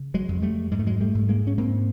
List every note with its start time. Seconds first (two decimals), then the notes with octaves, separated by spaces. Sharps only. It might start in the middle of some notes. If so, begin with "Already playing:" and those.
Already playing: C#3
0.14 F#3 G#3
0.29 F2
0.42 G3 A3
0.71 G#2 G#3
0.79 A3
0.87 F#3 G#3
1.01 G3 A3
1.15 G#2
1.29 G#3 A#3
1.47 C#4
1.58 G#2 A#3 C4